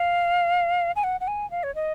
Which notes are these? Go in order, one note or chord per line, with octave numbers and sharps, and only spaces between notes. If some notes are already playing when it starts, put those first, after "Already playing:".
Already playing: F5
G#5
F#5
F#5
G#5
F5
C#5
D#5